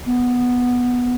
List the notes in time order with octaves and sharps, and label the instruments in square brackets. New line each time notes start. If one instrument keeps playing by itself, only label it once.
[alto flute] B3